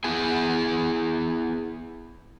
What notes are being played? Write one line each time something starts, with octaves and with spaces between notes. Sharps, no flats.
B3 E4 G#4 G#5